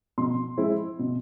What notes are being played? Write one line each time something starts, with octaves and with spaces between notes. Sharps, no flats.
B2 C6
G#3 C4 E4
B2